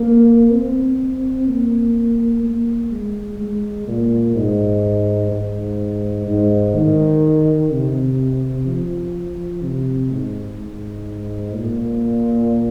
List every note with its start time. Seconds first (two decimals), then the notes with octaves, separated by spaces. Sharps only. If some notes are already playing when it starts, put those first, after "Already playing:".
Already playing: A#3
0.52 C4
1.48 A#3
2.43 A#3
2.92 G#3
3.40 G#3
3.88 A#2
4.36 G#2
5.32 G#2
6.27 G#2
6.75 D#3
7.72 C3
8.67 F3
9.63 C3
10.11 G#2
10.59 G#2
11.55 A#2